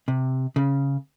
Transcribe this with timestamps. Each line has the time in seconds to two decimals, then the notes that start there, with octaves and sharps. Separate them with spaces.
0.08 C3
0.56 C#3